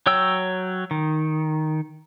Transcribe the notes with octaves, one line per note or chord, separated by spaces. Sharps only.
F#3 C#5 G5 E6
D#3